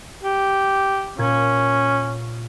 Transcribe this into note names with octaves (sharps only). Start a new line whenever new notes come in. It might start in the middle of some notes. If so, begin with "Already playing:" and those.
G4
A#2 C#4 G#6